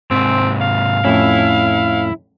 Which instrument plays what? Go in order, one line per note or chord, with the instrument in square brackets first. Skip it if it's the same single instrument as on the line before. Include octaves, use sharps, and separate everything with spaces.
[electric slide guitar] G#2 C3 [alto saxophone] C4
[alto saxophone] F5
[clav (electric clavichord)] F2 A2 C#4 [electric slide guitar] E4